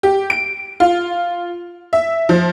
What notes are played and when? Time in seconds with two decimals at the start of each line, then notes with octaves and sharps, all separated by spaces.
0.03 G4
0.30 D7
0.80 F4
1.93 E5
2.29 F3